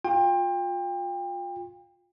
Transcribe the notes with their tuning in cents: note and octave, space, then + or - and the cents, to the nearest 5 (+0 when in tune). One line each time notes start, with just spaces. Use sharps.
F4 +25 G5 +30